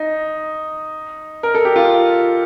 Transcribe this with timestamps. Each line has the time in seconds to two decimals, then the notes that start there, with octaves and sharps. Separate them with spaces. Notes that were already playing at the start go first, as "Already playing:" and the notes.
Already playing: D#4
1.43 A#4
1.55 A4
1.65 G4
1.76 F4